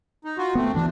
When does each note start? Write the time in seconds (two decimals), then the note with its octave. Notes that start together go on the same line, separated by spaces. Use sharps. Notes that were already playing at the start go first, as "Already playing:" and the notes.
0.25 D#4
0.38 F4 F#4
0.55 A3 B3 C4
0.74 D2 E3 D4